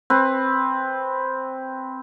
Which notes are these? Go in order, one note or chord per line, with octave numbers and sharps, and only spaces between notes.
C4 B4